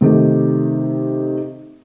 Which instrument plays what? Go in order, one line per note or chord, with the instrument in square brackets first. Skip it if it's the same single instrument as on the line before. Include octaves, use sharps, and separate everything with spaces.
[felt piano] C3 D#3 A3 G4